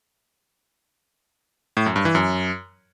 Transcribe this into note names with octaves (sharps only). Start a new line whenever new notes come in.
A2
F#2
G2
E3
F#2